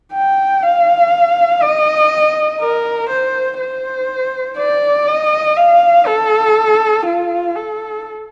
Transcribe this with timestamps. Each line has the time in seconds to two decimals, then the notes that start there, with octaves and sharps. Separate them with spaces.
0.13 G5
0.63 F5
1.62 D#5
2.61 A#4
3.10 C5
3.60 C5
4.58 D5
5.08 D#5
5.57 F5
6.06 A4
7.06 F4
7.56 A4